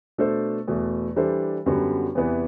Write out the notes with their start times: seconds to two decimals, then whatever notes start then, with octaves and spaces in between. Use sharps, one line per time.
0.18 B2 A3 D4 A4 C5
0.68 E2 B2 A3
1.16 E3 G3 D4 A4 C5
1.66 F#2 D3 G3 B3 F#4
2.15 E2 C3 E3 B3